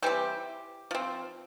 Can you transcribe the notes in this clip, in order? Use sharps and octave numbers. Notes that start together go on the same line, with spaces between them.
E3 G3 C4 G4
F3 C4